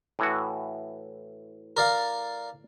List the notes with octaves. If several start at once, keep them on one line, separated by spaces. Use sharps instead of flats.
A2 E3 F#4
A#4 D5 F5